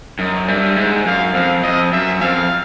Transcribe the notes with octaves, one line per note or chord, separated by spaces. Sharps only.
F#2 D#5
G2 E5
G#2
F#2 F5
F2 F5
F2 D#5
F#2 E5
F2 F5